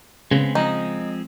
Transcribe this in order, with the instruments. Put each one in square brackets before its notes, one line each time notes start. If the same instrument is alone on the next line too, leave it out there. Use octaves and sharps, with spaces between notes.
[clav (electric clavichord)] C#3 [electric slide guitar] G#3 B3 C4
[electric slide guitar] F3 G#3 C4 [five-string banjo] D#4